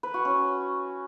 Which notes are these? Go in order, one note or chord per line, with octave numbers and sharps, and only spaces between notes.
B4
F#4
C#4